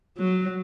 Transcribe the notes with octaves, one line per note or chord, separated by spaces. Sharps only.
F#3